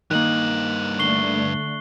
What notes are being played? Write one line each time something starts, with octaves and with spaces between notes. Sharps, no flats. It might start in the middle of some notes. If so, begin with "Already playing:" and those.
G2 D#3 A#3 D#5 F#6 F#7
D3 A3 C#6 C7 G7